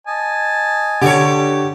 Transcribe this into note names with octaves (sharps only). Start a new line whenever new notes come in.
D#5 G#5 A5
D3 G4 A4 C#5